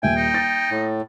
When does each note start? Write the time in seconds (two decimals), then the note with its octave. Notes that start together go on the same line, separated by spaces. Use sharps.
0.03 D#1 E5 G5 G#5
0.17 D#4
0.34 A6
0.71 A2